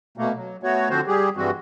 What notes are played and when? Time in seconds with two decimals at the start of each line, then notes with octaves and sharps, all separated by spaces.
0.17 B2 A3 A#3
0.35 F#3
0.63 A3 B3 F#4 C#5
0.90 D3 F3 C4 F#4 C5
1.07 G3 G4 G#4
1.37 G2 E3 G3 G#3 C4 F#4